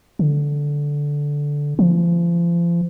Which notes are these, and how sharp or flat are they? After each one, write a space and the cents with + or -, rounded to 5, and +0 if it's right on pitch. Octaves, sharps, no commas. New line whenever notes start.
D3 -10
F3 -35